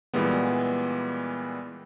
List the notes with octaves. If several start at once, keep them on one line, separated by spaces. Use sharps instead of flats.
A#2 E3 G3 G#3 B3